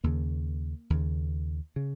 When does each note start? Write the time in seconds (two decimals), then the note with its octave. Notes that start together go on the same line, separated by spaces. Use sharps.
0.04 D#2 C#3 A#3
0.90 D#2 C#3
1.76 C#3